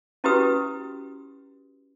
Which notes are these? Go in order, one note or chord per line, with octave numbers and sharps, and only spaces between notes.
C#4 E4 F#4 G4 B4 D#6